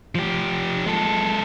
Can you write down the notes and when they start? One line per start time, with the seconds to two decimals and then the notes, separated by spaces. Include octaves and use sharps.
0.15 F3 G4
0.86 G#3 A4